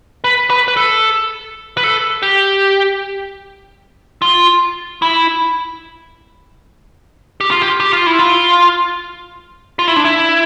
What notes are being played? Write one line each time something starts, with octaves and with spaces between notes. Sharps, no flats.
B4
B4
B4
A4
B4
A4
G4
F4
E4
G4
F4
G4
G4
F4
E4
F4
F4
E4
D4
E4